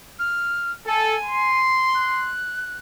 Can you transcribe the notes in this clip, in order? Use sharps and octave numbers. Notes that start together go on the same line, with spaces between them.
F6
A4 G#5
C6
F#6